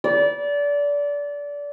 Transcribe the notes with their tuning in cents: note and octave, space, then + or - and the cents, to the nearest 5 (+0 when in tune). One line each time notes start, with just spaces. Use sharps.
D5 -25